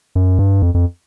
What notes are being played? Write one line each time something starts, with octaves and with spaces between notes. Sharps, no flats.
F#2
G2
F2
F2